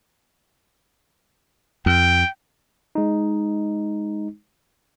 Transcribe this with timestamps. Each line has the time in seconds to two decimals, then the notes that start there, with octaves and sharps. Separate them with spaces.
1.86 F2 G5
2.95 G#3 D#4